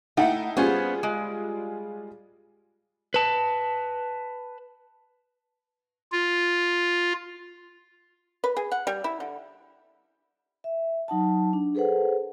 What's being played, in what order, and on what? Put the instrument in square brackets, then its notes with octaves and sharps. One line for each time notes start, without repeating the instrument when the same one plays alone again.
[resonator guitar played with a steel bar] A3 F#5 G5 [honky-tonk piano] D#4 E4
[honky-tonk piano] G3 F4 G#4 [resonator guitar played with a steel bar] B3 C#4 C5
[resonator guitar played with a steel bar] G#3
[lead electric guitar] B4 A5
[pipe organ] F4
[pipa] B4
G#4
F#5
G3
E4
D3
[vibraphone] E5
F#3 D#4 F#5 A5
D4
G#4 A4 B4 C5 F#5